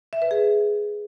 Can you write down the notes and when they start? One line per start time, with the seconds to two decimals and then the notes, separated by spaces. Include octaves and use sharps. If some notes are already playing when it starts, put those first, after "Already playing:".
0.13 E5
0.22 B4
0.31 G#4